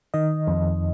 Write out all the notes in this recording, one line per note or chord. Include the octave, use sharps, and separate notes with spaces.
D#3 D#5
F2